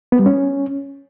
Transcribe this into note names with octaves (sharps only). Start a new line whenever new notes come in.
B3
G3
C#4